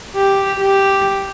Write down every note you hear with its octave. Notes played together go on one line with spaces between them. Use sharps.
G4
G4